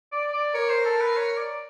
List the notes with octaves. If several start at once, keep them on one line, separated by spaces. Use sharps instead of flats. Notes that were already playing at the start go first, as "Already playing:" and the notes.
D5
D5
A#4 C#5
C5
A4
B4
C#5
D5